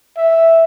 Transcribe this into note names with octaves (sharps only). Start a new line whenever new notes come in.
E5